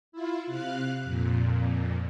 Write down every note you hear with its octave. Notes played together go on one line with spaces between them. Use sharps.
E4 F4
C3 F5 F#6
F2 A#2